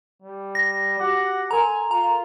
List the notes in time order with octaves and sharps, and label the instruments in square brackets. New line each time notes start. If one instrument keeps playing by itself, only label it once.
[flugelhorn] G3
[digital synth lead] A#6
[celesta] F#4 G4 D6 [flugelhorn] F#5
[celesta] A4 A#4 C6 [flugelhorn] G#5 [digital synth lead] A#5
[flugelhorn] F4 [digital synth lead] A#5